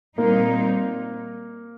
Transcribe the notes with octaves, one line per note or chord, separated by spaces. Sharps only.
A#2 G3 A#3 C4 D#4